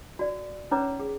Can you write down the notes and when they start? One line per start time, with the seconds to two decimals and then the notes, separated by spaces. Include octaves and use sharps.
0.19 F#4 D5
0.71 C#4 D#4 B4 C#5 A#5 D6
1.00 G#4